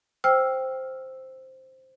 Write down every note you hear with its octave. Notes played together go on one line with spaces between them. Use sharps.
C5 G5 E6 F6